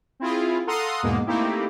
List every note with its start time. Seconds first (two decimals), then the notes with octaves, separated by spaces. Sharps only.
0.20 C4 E4 F4 G#4
0.67 A4 F5 F#5 A#5 C6 D#6
1.03 E2 G#2 B2 G#3 A#3 B3
1.26 A3 A#3 C4 D#4 E4 G4